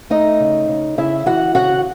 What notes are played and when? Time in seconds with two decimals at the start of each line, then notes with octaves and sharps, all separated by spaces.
0.10 A3 D#4 D#5
0.40 C#3
0.68 C#3
0.98 C#3 E4 E5
1.26 E3 F#4 F#5
1.55 C#3 F#4 F#5